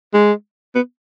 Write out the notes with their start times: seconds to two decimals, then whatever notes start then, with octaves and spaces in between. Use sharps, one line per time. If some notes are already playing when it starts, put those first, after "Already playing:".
0.14 G#3
0.75 B3